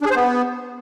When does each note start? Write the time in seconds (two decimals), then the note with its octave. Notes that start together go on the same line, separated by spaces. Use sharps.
0.01 D4
0.06 G#4
0.11 C5
0.16 B3